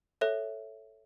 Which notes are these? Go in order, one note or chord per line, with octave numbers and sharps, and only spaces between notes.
A4 C#5 E5